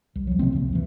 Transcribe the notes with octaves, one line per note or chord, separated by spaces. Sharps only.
C2
D#1 F3 F#3
C3 E3 A#3 C4
F1 C2
C#2 E3